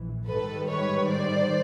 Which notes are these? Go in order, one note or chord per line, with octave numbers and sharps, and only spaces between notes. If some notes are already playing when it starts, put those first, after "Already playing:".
Already playing: A#1 E3
G#2 D#3 G3 A4 B4
B4 C#5
C5 D5